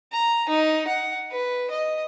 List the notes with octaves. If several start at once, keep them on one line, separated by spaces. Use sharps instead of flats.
A#5
D#4
F#5
B4
D#5